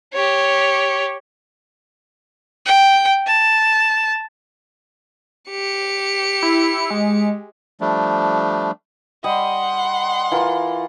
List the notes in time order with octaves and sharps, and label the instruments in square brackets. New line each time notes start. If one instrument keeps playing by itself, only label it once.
[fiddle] G4 C#5
G5
A5
[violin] G4 C#7
[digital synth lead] E4
G#3
[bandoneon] F3 G3 A3 D4
[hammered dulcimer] G3 D#5 [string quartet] F#5 C6
[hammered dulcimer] E3 F4 A#4